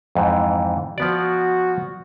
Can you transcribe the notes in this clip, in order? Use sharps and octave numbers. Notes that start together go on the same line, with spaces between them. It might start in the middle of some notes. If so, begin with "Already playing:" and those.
F2 G#2 E3
F3 B3 F#4 D5